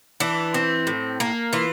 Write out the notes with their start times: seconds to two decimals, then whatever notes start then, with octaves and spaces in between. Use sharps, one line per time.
0.20 E3 D4
0.54 C4
0.87 A2
1.20 A#3
1.53 E3 F4